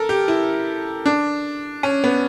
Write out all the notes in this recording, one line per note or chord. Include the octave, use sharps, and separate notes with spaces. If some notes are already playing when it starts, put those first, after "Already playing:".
Already playing: A4 A#4
G4
E4
D4
C#4
B3